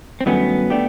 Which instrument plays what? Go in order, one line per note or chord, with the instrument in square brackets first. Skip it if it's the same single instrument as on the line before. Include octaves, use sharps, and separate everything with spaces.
[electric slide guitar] C4
[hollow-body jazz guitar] G2 D#3 F#3 A3 C#4 [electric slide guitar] B3
[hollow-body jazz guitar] A3 D4 G4